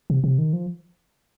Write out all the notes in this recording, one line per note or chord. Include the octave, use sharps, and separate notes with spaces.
C3
C3
D#3
F3